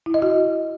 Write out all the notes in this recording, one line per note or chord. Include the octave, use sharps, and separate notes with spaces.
E4
D#5
F#4